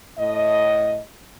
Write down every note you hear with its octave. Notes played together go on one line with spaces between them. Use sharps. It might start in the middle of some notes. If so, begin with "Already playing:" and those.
A2 D#5